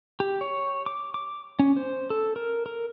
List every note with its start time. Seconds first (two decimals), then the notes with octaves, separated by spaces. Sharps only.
0.20 G4
0.41 C#5
0.86 D6
1.14 D6
1.59 C#4
1.76 C5
2.10 A4
2.36 A#4
2.66 A#4